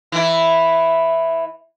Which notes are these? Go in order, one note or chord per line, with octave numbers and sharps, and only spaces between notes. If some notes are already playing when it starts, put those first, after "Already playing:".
E3 E4